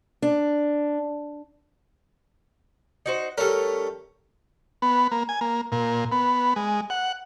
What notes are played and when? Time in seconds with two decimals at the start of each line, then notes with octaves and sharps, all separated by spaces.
0.22 D4
3.06 D#4 F#4 C5
3.38 G3 A3 C#4 A4 A#4
4.82 B3
5.11 A#3
5.29 G#5
5.41 A#3
5.72 A#2
6.12 B3
6.56 G#3
6.90 F#5